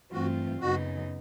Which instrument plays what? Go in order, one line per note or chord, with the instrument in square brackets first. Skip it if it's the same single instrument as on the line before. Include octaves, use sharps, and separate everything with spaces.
[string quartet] G2 E3 A3 C4 F4 [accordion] F#4
[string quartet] F#2 C#3 F#3 B3 D#4 [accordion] F#4